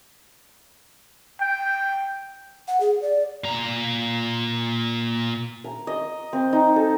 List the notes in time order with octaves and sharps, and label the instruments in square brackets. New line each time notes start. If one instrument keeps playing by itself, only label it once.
[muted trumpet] G5
[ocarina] F#5
G#4
D5
[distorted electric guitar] A#2 A#5
[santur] A#5
D#5
C4
D#4
A4